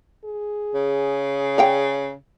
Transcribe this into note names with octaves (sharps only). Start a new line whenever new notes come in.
G#4
C#3
D5 F5 G5